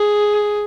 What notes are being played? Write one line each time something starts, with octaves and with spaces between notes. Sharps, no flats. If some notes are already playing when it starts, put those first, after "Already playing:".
Already playing: G#4